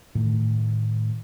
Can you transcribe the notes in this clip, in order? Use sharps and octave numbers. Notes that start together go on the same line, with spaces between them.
A2 D#3 A3